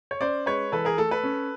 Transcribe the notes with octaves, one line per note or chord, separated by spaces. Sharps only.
C#5
C#4 C5 D5
G#3 B4 C#5
E3 A4 B4
G#4 A#4
A3 A4
A4 B4
C#4